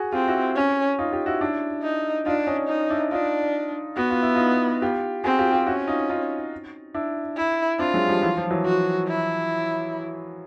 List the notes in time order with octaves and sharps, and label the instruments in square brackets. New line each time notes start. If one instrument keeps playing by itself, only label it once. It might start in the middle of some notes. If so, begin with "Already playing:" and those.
Already playing: [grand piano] F#4 G#4
[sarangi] C4 [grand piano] F4 G4
[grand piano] E4 F#4
[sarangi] C#4
[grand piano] D#4 F4
F4 G4
E4 F#4
D4 E4
[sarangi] D#4
[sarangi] D4 [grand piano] D#4 F4
[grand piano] C#4 D#4
[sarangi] D#4
[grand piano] D4 E4
[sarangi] D4 [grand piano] D#4 F4
[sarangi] B3 [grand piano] F#4
[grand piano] F4
E4
D#4 F4
F4 G4
[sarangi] C4 [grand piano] F#4 G#4
[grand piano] F4 G4
F4 G4
[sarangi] C#4 [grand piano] E4 F#4
[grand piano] D#4 F4
D#4 F4
D4 E4
[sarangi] E4
[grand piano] C4 D4 [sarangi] F4
[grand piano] F#3 G#3
F3 G3
E3 F#3
F3
E3 F#3
[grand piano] F3 [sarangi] F#4
[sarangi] E4